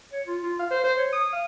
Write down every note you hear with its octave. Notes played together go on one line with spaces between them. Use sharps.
C#5
F4
F4
F5
C5
C5
C#5
D#6
F5